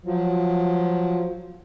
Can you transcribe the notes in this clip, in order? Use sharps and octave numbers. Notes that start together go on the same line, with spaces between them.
F3 F#3